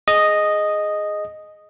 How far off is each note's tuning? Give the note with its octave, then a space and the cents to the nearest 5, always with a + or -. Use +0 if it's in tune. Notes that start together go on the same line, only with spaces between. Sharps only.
G#4 +10 D#5 -5 D#6 +0